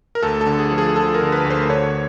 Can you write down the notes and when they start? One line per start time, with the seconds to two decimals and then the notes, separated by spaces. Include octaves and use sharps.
0.15 A#4
0.23 D2 A4
0.41 A4
0.46 D3
0.59 G#4
0.71 F3
0.78 G#4
0.96 F3 A4
1.14 A#4
1.21 D3
1.32 B4
1.45 D2
1.50 C5
1.69 D3 C#5